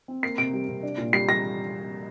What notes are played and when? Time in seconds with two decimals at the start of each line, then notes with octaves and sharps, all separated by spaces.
0.08 C4
0.23 A#3 C7
0.38 C3 D7
0.53 G3
0.68 C3
0.83 D4
0.98 A#2
1.13 G3 C7
1.28 G3 A#6